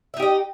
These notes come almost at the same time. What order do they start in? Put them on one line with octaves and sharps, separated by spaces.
E5 D#4 G4 D#5